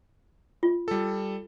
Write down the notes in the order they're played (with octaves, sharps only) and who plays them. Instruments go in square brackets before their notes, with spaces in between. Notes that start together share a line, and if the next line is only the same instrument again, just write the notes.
[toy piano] F4
[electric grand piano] G3 A4